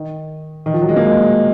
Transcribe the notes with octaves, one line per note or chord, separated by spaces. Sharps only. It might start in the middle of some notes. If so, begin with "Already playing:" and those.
Already playing: D#3
D#3
F3
F#3
G#3
A#3
G#3